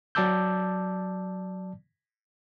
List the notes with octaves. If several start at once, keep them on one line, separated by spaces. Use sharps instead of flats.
F#3 D5 A5 D6 E6 G6